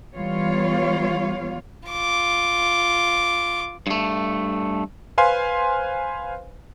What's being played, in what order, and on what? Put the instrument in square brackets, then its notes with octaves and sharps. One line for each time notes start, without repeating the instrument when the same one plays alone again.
[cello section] E3 G3 B3 F4 C#5 F5
[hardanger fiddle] F4 D6
[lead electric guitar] G2 A3
[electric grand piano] B4 C5 F5 G#5 C6